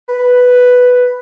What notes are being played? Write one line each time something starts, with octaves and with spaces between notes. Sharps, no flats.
B4